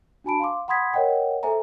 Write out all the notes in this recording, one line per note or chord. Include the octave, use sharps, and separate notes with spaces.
D4 F#4 G#5 A5 B5 D7
F5 C6 D6
F#5 B5 C6 D#6 G#6 B6
A#4 C#5 D#5 F#5 G5
A4 C5 E5 G#5 A#5